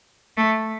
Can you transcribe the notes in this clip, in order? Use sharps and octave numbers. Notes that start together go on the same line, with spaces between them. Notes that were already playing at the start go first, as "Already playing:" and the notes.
A3